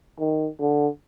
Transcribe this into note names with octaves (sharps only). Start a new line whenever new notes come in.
D#3
D3